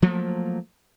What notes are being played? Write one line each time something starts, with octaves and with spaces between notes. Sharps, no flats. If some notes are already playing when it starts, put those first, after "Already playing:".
F3 F#3 A3 A#3